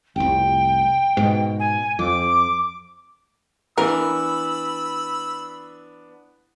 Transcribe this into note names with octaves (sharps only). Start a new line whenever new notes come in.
F1 C2 G5
G#2 B2
G#5
F2 D6
E3 B3 D4 A#4 B5 E6